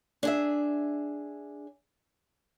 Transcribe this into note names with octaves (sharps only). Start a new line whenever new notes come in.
D4 G#4 E5